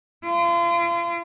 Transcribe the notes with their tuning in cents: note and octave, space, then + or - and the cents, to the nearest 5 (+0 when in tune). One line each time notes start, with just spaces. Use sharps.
F4 -40